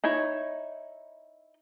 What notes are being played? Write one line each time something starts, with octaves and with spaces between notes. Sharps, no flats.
D#4 E4 C#5